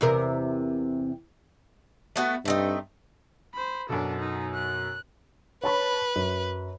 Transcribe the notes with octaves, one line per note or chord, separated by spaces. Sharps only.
E2 C3 A#4
A3 B3 F#4
G2 A3 C4 D#4
C5 B5
F#2 B2 D4 A4
D#4
F#6
B4 C#5 A5 B5
F#2